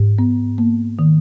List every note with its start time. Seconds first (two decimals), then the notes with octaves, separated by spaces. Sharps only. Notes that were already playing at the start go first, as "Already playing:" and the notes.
Already playing: G#2
0.18 B3
0.58 A#3
0.99 D#3